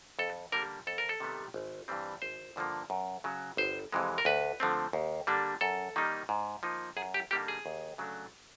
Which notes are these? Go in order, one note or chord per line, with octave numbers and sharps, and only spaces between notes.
F2 A4
D3 G3 A#3 A#4
F2 A4
A#4
A4
C3 D#3 G3 B3
G#1
G2 E3 G3 C4
G#1 C5
G2 D3 F3 A#3
F#2
C#3 F#3
G1 C5
F2 C3 E3 G#3
A#4
D2 B4
D3 F3 A3 C4
D#2
D3 G3 A#3 D4
F#2 A4
D#3 G3 A#3 D#4
G#2
F3 A#3 D#4
F#2 G#4
G4
D3 G3 A#3 D#4 G4
G#4
D#2
C#3 F#3 A3 D4